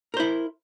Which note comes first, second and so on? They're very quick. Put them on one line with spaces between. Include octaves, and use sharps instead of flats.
A#4 C5 E4